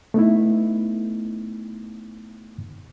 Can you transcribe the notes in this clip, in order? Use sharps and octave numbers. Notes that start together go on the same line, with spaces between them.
A3 B3 D#4 E4